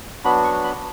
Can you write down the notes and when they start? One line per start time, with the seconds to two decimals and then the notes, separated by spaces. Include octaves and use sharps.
0.24 F#3 B3 D4 F#4 B5
0.44 C#6
0.64 B5